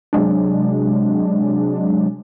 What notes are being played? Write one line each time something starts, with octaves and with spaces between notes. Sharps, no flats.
C3 F#3 G#3 D4